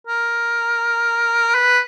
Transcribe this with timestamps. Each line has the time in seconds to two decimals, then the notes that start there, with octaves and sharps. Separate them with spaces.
0.07 A#4
1.55 B4